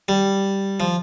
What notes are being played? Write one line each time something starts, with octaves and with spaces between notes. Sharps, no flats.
G3
F3